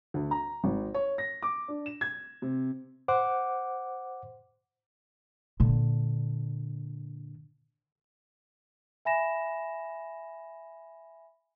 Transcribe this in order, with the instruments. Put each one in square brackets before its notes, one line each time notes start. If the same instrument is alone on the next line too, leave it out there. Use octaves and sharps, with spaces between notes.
[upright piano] D2
A#5
G#1
C#5
A#6
D6
D4
E7
G#6
C3
[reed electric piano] C5 F#5 D6
[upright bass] A#2 D3
[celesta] E5 G#5 B5 A#6 E7